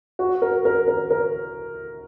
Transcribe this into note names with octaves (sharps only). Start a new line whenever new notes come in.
F#4
A#4
A#4
A#4
A#4